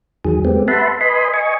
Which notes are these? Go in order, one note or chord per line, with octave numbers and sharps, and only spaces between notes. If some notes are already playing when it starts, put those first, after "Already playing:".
E2 D#3 F#3 G#4
G#3 A3 B3 C4 G4
B4 E5 F#5 A5 B5 C6
B4 D#5 G#5 B5 C6
D#5 G#5 C#6